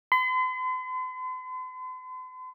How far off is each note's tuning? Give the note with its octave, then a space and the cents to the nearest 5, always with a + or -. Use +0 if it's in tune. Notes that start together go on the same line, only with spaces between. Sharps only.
C6 -45